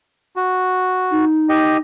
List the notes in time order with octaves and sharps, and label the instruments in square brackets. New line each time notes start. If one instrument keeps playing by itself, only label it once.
[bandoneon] F#4
[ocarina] D#4
[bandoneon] G4 D#5